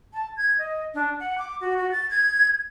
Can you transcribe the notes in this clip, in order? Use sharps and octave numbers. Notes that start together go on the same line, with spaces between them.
A5
G#6
D#5
D4
F#5
D6
F#4
F#4
A6
G#6